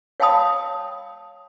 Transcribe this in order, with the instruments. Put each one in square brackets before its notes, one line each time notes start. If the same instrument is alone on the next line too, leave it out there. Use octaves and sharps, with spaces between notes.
[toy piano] C#5 F5 G5 A5 B5 D#6